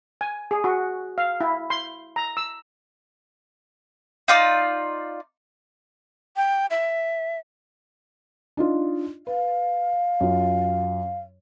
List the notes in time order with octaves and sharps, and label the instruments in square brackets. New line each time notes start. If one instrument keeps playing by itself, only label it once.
[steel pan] G#5
G#4
F#4
F5
E4
C6
A#5
E6
[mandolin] D#4 F4 D5
[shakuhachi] G5
E5
[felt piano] D4 D#4 F4
[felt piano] B4 [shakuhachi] F5
[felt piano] F#2 F4